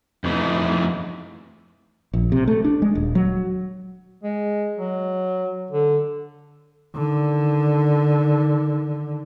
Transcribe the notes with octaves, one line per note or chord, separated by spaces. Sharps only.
F2 E3 A3 D#4
A#1
C3
A3
D4
G#3
D#1
F#3
G#3
F#3
D3
D3 D#3